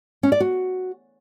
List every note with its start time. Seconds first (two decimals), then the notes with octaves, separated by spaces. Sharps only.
0.23 C#4
0.32 D5
0.40 F#4